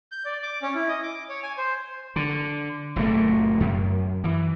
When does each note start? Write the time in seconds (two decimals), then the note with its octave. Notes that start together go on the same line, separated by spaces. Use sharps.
0.12 G6
0.25 D5
0.43 D6
0.62 C#4
0.75 E4
0.88 D#5
1.03 D6
1.29 C#5
1.43 G#5
1.58 C5
2.16 D3
2.96 F#1 A#2 A3
3.60 F#2
4.24 E3